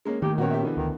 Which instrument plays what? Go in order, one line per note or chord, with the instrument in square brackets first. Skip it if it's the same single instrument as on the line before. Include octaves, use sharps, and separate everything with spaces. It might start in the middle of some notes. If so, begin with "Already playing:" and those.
[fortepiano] G#3 A#3 C#4
[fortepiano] D#2 A2 [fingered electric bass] D#3 [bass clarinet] G4
[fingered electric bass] A#2 B3 C#4 [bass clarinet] D#3 [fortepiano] F#4 B4 C#5
[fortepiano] G4 E5
B2 D3 E3
[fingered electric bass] D2 [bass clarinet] D#3